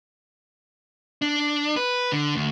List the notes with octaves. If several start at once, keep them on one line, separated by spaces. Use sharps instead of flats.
D4
B4
D3
D2